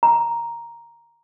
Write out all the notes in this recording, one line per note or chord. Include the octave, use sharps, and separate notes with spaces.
A#5